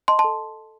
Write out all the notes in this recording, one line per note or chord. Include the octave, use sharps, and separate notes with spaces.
D#5 A5 C6
A5 C6
A4